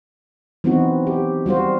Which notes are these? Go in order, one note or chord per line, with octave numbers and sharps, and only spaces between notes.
E3 F#3 B3 C4 D#4 F#4
G4
G3 F4 F#4 C5